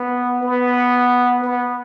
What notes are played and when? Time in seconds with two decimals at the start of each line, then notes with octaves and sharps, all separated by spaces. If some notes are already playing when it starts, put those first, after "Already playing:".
Already playing: B3
0.43 B3
1.44 B3